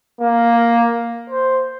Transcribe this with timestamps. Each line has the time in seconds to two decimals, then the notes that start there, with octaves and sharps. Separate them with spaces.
0.21 A#3
1.30 C5